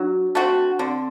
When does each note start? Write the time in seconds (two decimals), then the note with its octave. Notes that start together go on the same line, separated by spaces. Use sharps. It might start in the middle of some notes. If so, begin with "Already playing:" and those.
Already playing: F#3 D4
0.35 A3 C4 F#4
0.79 D3 C4